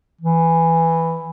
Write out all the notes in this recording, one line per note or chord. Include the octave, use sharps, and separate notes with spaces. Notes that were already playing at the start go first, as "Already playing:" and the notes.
E3